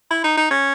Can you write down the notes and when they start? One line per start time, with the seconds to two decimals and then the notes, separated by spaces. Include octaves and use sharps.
0.11 E4
0.24 D#4
0.37 D#4
0.51 C#4